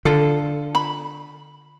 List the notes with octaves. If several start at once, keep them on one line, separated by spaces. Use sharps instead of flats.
D3 F4 A4
B5